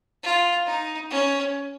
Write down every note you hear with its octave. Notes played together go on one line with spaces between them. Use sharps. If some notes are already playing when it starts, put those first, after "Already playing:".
F4
D#4
C#4